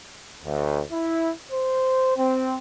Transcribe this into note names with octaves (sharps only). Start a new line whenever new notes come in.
D2
E4
C5
C4